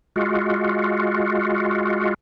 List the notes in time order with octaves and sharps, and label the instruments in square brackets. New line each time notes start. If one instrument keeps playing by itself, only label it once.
[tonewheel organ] G#3 F4 F#4